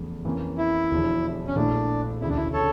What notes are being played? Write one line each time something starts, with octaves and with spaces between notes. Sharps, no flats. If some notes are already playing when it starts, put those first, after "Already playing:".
Already playing: E2 C#3 F3 A3
F2 E3 A#3 C#4
E4
E1 E2 D3 F3
C#4
A#1 A#2 A3 D4 E4
E1 D2 C#3 E4
D4
E4
A4 C#5